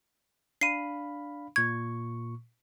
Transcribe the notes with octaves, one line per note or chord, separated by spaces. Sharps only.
D4 F5 B5 C7 D#7
A#2 C#6 G#6